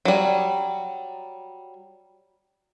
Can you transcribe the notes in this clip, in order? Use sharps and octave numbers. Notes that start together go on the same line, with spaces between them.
F#3 G3